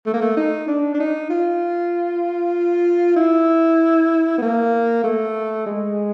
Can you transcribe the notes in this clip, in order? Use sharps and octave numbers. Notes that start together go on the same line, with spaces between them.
A3
A#3
A3
D#4
D4
D4
D#4
F4
E4
B3
A#3
A3
G#3